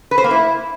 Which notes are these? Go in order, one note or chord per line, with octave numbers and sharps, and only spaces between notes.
B4
C5
A#3
E4